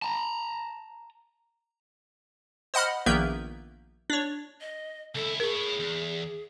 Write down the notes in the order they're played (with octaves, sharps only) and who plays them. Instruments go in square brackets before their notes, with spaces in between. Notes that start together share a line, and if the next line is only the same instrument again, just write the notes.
[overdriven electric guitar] A5 A#5
[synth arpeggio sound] C5 D#5 F#5 B5 F6
A#1 D#3 A#3 B3 E5 G6
D4 C#5
[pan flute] D#5
[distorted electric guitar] C#2 E4 [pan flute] A4
[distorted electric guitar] E4 C#5 [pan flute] G#4 [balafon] A#4
[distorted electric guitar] E2